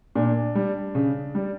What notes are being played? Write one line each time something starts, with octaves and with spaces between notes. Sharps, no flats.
A#2 D4
G3
C#3
G3